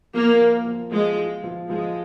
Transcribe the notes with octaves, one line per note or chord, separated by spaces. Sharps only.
F3 A#3
F3
F3
F3 G#3
F3
F3
F3 G#3